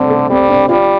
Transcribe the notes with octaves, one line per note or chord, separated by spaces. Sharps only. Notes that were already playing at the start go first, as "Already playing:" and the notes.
Already playing: D3 G3 A3 C4
A3
G3 C4
D4
G3 F4